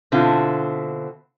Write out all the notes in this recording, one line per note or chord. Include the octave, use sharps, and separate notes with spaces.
B2 D3 C4 E4 F4